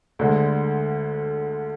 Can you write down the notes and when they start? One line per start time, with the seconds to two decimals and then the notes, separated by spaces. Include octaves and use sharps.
0.19 D2 D3 G#3